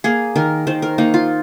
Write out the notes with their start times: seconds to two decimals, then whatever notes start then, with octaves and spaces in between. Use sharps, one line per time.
0.04 A#3 G#4
0.36 D#3 A#4
0.67 D#3 C5
0.82 A#4
0.98 A#3 D#4
1.14 F4